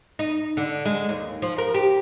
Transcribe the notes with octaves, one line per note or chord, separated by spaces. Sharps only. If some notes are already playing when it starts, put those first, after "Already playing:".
D#4
D3
G#3
D#2
F3
A#4
G4